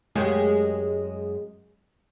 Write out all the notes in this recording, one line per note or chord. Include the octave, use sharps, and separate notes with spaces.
F#2 G#3 G4